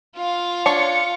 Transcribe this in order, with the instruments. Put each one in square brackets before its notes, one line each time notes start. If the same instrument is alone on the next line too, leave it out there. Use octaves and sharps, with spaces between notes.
[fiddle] F4 F5
[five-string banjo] D4 C#5 [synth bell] C#7